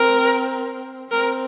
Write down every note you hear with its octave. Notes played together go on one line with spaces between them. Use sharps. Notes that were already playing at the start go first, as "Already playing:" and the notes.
Already playing: C4 A#4
C4 A#4